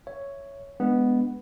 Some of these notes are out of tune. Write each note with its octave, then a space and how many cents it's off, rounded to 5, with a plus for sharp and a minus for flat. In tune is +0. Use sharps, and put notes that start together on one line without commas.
C#5 +0 E5 +10
G#3 +0 B3 +0 D4 -10